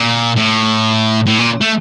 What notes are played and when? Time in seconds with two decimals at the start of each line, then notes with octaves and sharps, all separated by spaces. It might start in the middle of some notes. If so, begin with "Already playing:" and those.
Already playing: A#2
0.36 A2
1.26 A2
1.39 A#2
1.61 A3